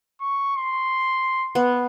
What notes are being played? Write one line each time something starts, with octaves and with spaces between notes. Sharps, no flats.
C#6
C6
B3